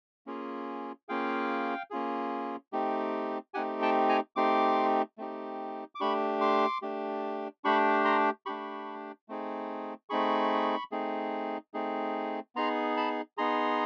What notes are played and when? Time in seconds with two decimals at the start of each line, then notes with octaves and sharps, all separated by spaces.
0.26 A#3 C#4 F4 G#4
1.09 A#3 C#4 F4 G#4 F5 G5
1.91 A#3 C#4 F4 G#4
2.73 A3 C4 D#4 G4
3.54 A3 C4 D#4 G4 F#5 G#5
3.82 G5 A5
4.09 G#5 A#5
4.36 A3 C4 D#4 G4 C6 D6
5.18 A3 C4 D#4 G4
5.95 D6
6.00 A3 D4 G4 B5 C#6
6.41 C6 D6
6.82 A3 D4 G4
7.64 A3 D4 G4 B5 C#6
8.05 A#5 C6
8.46 A3 D4 G4 B5 C#6
9.29 A3 C4 D#4 G#4
10.10 A3 C4 D#4 G#4 B5 C#6
10.92 A3 C4 D#4 G#4
11.74 A3 C4 D#4 G#4
12.55 B3 D#4 G#4 A#5 C6
12.97 A5 B5
13.37 B3 D#4 G#4 A#5 C6